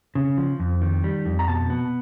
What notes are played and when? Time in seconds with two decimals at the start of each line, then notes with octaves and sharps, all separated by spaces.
0.15 C#3
0.38 F3
0.59 F2
0.82 D#3
1.04 G3
1.26 F2
1.39 A#5
1.48 B2 A5
1.70 B3